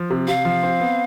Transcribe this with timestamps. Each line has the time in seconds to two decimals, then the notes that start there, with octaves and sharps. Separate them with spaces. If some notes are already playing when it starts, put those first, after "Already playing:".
Already playing: F3
0.10 C3
0.28 C3 F5
0.45 F3
0.63 C4
0.80 B3